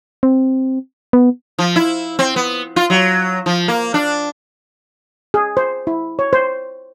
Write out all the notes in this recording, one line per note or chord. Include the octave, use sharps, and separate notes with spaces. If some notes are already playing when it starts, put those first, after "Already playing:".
C4
B3
F3
E4
C4
B3
F4
F#3
F3
A#3
D4
G#4
C5
E4
C#5
C5